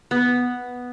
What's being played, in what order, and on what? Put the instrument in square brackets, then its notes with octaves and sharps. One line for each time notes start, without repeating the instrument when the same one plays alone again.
[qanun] B3